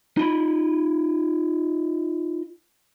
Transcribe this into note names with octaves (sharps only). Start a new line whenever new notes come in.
D#4 F4 B5